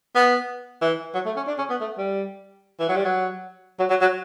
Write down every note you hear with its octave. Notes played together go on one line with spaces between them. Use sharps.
B3
E3
F#3
A3
C#4
D4
C#4
B3
A3
G3
E3
F#3
G3
F#3
F#3
F#3
F#3